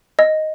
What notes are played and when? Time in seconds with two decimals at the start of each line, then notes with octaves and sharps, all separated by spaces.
0.19 D#5